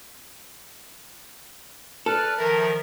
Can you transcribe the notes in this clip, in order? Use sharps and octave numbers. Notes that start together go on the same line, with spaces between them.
A4 B4 D5 F6
D#3 F3 A#4 E5